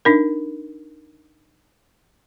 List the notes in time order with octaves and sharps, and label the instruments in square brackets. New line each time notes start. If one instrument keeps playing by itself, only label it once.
[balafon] D4 D#4 A#4